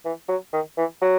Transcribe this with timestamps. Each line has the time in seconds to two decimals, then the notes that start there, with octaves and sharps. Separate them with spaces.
0.05 E3
0.29 F#3
0.53 D#3
0.77 E3
1.02 F#3